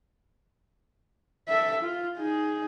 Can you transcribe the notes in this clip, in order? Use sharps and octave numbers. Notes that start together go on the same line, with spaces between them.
A4 E5
F4
D#4 G#4